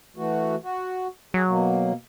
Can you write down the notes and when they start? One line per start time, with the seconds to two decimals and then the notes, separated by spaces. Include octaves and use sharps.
0.17 E3 A3 F#4
0.63 F#4
1.34 F#3 G#4
1.47 B2 A#3